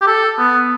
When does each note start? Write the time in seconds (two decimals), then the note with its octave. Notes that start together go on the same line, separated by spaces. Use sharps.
0.02 G4
0.07 A4
0.38 B3